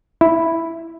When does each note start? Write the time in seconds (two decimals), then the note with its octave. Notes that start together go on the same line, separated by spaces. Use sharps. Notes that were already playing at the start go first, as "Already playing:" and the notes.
0.21 E4